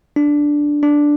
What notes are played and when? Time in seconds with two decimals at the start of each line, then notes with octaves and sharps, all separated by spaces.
0.16 D4
0.83 D4